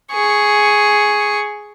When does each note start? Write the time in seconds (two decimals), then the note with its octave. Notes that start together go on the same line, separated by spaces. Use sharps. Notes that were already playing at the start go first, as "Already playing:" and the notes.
0.12 G#4 C#6